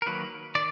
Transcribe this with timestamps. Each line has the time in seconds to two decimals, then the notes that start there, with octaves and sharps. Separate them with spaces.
0.02 A#4
0.06 D#3 F#3 A#3 B4
0.55 D#3 D5